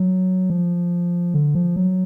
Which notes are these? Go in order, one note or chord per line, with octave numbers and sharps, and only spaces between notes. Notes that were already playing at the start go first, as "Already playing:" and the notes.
Already playing: F#3
F3
D3
F3
F#3